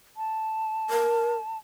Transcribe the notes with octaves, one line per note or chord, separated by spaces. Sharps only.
A5
A#4